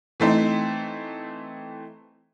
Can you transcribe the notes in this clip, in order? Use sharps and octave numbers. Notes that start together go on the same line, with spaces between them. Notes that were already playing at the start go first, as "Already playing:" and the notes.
E3 A3 C4 D#4